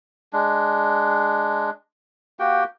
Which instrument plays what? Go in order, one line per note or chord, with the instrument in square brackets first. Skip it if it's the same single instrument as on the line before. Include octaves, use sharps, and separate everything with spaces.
[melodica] G#3 D4
A#3 F#4 G4 G5